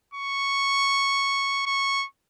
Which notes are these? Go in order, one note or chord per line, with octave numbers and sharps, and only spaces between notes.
C#6
C#6